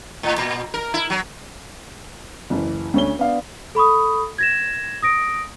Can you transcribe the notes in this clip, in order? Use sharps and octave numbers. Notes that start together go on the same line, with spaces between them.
A2
A#2
A#4
E4
F#3
F#1 E3
D2 C#4 G7
B3 D4 F5
A4 B5 C#6 D#6
G#6 A#6 E7
D#6 A#6 D7